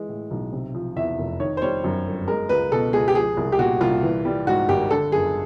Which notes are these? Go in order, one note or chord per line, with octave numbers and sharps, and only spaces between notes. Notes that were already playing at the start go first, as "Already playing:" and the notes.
Already playing: E3 G#3
A2
B1
C3
F3
E2 E5
F1
D#3 C#5
C5
G3 C#5
F#2
G1
G#3 A#4
C#2 B4
B2 A4
C#2 G#4
G4
F3 G#4
C2
G4
A#2 F#4
C2 F4
E3
G3
G#2 F#4
G#1 G4
D3 A4
F#1 G#4